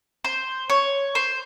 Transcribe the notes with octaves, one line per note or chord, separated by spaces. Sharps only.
C5
C#5
C5